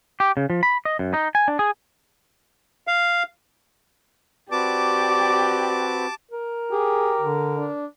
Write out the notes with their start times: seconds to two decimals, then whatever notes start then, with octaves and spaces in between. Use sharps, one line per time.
0.20 G4
0.37 C#3
0.50 F3
0.63 B5
0.85 D#5
0.99 F#2
1.14 D#4
1.35 G#5
1.48 D4
1.59 G#4
2.87 F5
4.52 C4 F#4 G4 B4 D5 A5 D6
6.31 A#4
6.72 G4 G#4
7.21 D3
7.58 D4